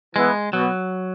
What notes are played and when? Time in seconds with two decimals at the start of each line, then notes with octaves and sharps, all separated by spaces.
0.16 E3 G#3 B3 E4
0.53 B2 F#3 B3 F#4